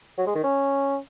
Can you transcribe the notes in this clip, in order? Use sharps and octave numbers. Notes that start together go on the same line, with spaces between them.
F#3
G#3
D#3
C#4